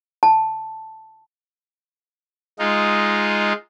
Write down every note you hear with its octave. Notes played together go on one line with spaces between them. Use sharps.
A5
G#3 D#4 F4